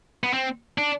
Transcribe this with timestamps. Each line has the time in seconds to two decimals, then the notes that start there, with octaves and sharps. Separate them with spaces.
0.24 B3
0.33 C4
0.78 D4